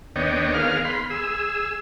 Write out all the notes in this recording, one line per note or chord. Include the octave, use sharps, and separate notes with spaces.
D#2 B3 D4 C#5 D#5 G5
D#3 B3 G#4 A#4 F5 F6
B5 C6
G#4 E6